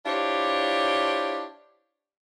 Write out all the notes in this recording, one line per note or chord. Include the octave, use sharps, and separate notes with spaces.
D4 E4 F4 G4 C5 C#5